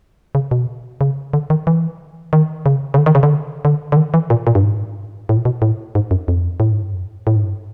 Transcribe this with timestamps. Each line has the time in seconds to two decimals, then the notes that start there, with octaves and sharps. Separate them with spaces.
0.35 C#3
0.51 B2
1.01 C#3
1.33 D3
1.50 D#3
1.67 E3
2.33 D#3
2.66 C#3
2.94 C#3
2.98 D3
3.06 D#3
3.15 C#3
3.23 D3
3.65 D3
3.92 D3
3.97 D#3
4.14 E3
4.30 A#2
4.47 A#2
4.55 G2
4.63 G#2
5.29 A2
5.37 A#2
5.45 B2
5.62 A2
5.95 G#2
6.11 F#2
6.28 F2
6.60 A2
6.71 G#2
6.82 G2
6.94 F#2
7.27 A2
7.36 G#2
7.45 G2